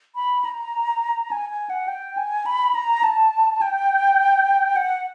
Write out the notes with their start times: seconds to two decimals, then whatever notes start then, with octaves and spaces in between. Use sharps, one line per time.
0.15 B5
0.45 A#5
1.31 G#5
1.50 G#5
1.70 F#5
1.88 G5
2.17 G#5
2.46 B5
2.75 A#5
3.03 A5
3.62 G5
4.76 F#5